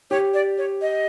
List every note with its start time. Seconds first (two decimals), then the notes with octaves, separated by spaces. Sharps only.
0.11 G4 C#5
0.34 D5
0.58 C#5
0.81 D#5